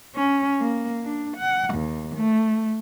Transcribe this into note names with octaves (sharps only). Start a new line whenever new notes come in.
C#4
A#3
D4
F#5
D#2
A3